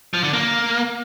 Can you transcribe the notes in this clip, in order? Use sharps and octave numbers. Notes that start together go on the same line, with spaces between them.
F3
D3
A#3